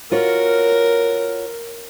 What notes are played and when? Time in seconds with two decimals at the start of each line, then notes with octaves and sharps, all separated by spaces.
0.12 F4 F#4 A#4 C#5